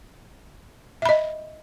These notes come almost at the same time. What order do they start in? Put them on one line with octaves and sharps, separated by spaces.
E5 B5 D#5